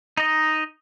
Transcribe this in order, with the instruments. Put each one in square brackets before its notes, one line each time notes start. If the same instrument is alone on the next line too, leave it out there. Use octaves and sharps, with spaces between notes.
[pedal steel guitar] D#4 D#5